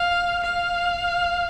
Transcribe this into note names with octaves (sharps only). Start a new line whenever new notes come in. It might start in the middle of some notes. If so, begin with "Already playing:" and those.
Already playing: F5
F5